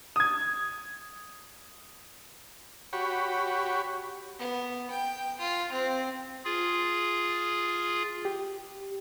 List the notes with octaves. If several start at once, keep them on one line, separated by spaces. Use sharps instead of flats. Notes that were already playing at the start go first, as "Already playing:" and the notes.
D#6 G#6
F#4 G4 C#5 B5
B3
G5
F4
C4
F4 G#4
G4